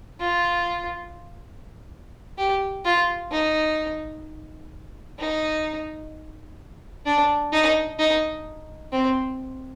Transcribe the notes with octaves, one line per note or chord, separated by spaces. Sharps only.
F4
G4
F4
D#4
D#4
D4
D#4
D#4
C4